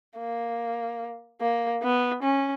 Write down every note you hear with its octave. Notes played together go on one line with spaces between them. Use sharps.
A#3
A#3
B3
C#4